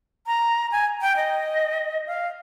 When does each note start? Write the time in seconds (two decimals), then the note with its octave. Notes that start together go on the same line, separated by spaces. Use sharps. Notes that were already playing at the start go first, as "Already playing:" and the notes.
0.27 A#5
0.72 G#5
1.02 G5
1.17 D#5
2.07 F5